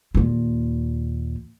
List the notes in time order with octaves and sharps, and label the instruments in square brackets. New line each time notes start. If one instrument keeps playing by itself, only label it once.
[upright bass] D#2 A#2